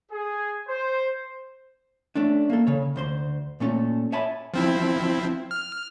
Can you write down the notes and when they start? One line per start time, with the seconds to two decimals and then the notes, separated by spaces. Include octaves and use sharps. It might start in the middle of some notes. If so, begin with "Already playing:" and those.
0.12 G#4
0.68 C5
2.15 A3 C#4 D4
2.50 A#3 A4
2.67 C#3 C#5
2.96 D2 C5 C6
3.60 A#2 A3 C#4 A4
4.12 C#5 E5 G#5 A5 B5
4.54 F3 C4 E4
5.51 F6